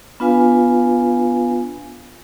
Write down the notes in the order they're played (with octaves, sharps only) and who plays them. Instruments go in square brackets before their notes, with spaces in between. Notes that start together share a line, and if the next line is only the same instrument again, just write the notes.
[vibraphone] B3 D4 F4 B4 F5 G#5